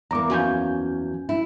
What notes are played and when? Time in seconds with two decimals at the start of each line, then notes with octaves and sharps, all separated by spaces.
0.11 E2 A#3 A#5 D6
0.30 F#2 F3 C#4 F#4 G#5 G6
1.29 E4